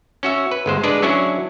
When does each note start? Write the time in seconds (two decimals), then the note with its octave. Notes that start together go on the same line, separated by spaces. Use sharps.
0.23 C#4 F#4 E5
0.51 B4
0.66 G1 G#3 C5
0.83 G#3 D4 G#4 B4 D5
1.02 F#3 C#4 D4 E4 F#4